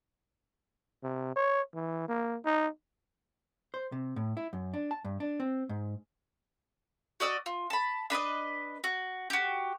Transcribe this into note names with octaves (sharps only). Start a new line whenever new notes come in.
C3
C#5
E3
A#3
D#4
C5
C3
A2
E4
F#2
D4
A5
G2
D4
C4
G#2
F#4 D5 D#5 E6
F4
A5 B5
D4 B4 D5 D#5
F#4
F#4 G4